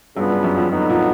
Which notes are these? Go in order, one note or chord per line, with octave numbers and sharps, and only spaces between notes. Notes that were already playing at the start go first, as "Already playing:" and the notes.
G2 C#3 F#3 B3 D4 F4
G2
F#2
F2
D3 F#3 B3 D#4
A#2